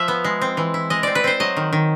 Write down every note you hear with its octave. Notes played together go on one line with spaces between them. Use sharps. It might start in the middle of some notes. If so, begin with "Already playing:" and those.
Already playing: F3 E5
B3
G#3
C4
E3
E4
G#3 D#5
C4 D5
B4
C4 C5
F#3 D#5
D#3
D#3